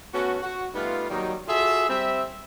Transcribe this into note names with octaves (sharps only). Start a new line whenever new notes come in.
A3 B3 C#4 F#4
F#4
G3 A3 B3 D#4 F4
D#3 F#3 G3 A#3 D#4
F4 F#4 G#4 A4 E5
G3 C4 E5